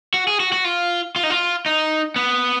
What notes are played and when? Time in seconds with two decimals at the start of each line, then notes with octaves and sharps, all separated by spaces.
0.14 F#4
0.27 G#4
0.40 F#4
0.52 F#4
0.65 F4
1.16 F4
1.23 D#4
1.30 F4
1.66 D#4
2.16 B3